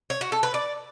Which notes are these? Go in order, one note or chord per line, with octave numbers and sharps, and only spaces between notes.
C#5
F#4
A4
B4
D5